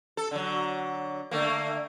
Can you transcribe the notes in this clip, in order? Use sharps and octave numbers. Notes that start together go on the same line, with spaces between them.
A4
D3 F#3
D3 A3 A#3